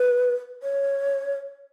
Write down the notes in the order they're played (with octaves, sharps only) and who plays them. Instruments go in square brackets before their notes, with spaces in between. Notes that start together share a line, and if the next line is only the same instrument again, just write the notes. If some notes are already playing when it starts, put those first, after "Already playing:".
Already playing: [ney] B4
C#5